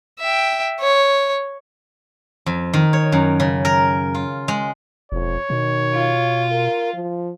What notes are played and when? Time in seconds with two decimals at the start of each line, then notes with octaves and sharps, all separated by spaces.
0.20 E5 G5
0.80 C#5
2.46 F2
2.73 D#3
2.93 C#5
3.12 F#2
3.40 C#3
3.65 A#4
4.15 F4
4.48 G#3
5.12 E1 F2 C#5
5.50 B2 D#3
5.94 F4
6.52 A#4
6.94 F3